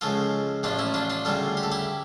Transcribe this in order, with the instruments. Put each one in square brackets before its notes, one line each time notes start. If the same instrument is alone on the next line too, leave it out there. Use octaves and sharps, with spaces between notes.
[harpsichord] C#2 C#3 F3 F4 A4
A1 A2 F3 D4 F4
C#4 E4
D4 F4
D4 F4
D2 C#3 G3 F4 A4
G4
A4
E4 G4